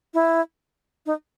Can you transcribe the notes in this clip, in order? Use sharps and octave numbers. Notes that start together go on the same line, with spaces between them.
E4
D#4